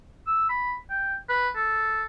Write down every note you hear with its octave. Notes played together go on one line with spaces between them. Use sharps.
E6
B5
G5
B4
A4